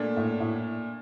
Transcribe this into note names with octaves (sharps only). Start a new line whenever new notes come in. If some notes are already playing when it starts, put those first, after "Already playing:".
Already playing: A#2 A3 D4
A2
A2